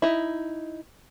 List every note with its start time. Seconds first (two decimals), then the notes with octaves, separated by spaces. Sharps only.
0.02 D#4 E4